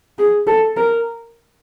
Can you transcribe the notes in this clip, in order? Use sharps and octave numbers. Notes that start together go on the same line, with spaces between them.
G#4
A4
A#4